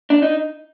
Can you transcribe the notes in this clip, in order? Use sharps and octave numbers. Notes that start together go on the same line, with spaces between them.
D4
D#4